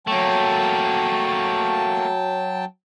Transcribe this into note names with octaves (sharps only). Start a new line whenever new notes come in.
F#3 A3 A#3 G5 A5